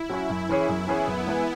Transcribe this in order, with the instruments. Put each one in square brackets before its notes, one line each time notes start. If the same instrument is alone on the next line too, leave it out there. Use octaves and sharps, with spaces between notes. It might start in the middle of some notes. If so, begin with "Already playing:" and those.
Already playing: [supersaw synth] E4
[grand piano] F#3 C#4 F#4
F#2
E3 C#4 G#4 C#5
[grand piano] F#2 [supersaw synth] B3
[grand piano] E3 C#4 G#4 C#5
F#2
E3 G#3 E4 B4